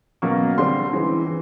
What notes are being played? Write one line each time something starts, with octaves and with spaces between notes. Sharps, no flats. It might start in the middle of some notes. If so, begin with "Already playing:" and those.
B2 F#3 A#3 C#4 C#6
D3 G3 C4 C6
C#3 E3 G#3 C4
E3